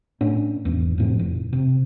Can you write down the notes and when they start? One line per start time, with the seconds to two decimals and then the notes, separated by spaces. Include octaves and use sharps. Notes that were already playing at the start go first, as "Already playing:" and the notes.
0.21 A2 C#4 D4
0.65 G#1 E2
0.98 F2 A2 F3
1.19 F1
1.53 C3